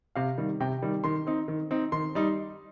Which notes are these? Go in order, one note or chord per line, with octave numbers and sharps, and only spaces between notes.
C3 F5
D#3 G3
C3 G5
D#3 G3
D#3 C6
C4 D#4
D#3
C4 D#4
D#3 C6
G3 D#4